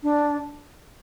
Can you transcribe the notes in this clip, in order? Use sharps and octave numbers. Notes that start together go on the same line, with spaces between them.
D4